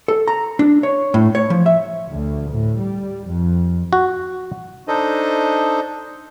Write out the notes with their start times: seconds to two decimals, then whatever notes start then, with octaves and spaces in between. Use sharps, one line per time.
0.08 A4
0.28 A#5
0.59 D4
0.83 C#5
1.14 A2
1.35 C#5
1.50 F3
1.66 E5
2.09 D2
2.53 A2
2.82 G3
3.28 F2
3.93 F#4
4.88 D4 D#4 A4 C5 D#5